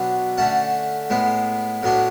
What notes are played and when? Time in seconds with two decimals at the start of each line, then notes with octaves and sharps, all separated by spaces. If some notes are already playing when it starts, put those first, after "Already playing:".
Already playing: B2 F#3 B3 D4
0.38 D3 A3 C#4 F#5 A5
1.10 A2 G#3 B3
1.83 A2 F#3 B3 D4